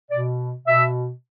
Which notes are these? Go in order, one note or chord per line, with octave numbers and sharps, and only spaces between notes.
B2 D5
B2 E5